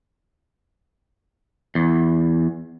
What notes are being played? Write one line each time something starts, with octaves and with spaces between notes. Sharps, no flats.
E2